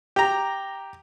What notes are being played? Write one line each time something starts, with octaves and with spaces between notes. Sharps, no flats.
G4 A#5